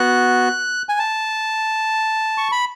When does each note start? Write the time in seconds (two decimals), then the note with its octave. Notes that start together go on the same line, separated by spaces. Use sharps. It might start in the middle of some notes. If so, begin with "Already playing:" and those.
Already playing: B3 F#4 F#6
0.89 G#5
0.99 A5
2.38 C#6
2.52 B5